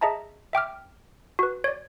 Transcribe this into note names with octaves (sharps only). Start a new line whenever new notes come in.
G#4 D#5 E5 A5 A#5
E5 G5 D6 F6
F#4 B4
C#5 D5